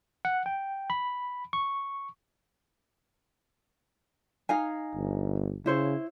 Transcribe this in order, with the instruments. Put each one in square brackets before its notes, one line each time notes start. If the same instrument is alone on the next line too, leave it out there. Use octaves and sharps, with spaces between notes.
[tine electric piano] F#5
G5
B5
C#6
[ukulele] D#4 F5 G#5
[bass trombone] G1
[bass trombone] C#3 [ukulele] E4 C5 C#5